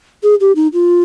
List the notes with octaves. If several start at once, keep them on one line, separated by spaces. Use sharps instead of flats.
G#4
G4
D#4
F4